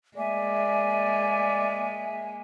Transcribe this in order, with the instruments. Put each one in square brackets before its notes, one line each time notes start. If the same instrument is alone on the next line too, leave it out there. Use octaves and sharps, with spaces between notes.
[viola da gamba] G#3 A#3 [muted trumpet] D5 [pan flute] E5 [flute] G#5